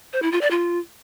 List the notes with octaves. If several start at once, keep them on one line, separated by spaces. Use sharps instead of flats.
C5
E4
F4
D5
F4